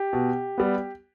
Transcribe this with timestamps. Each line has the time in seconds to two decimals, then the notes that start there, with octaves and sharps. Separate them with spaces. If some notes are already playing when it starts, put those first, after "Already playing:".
Already playing: G4
0.13 B2
0.58 G3 B3